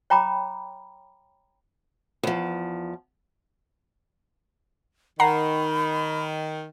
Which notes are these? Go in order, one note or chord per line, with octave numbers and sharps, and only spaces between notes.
C#5 G5 A#5 B5 D6
E2 F3
D#3 F#5 A#5 B5 C7